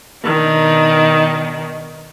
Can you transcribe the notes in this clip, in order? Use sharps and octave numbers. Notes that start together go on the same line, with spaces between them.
B2 D#3 D4 D#4